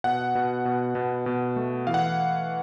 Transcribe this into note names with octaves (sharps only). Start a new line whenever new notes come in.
B2 F#5
B2
B2
B2
B2
A3
E3 F5
F#5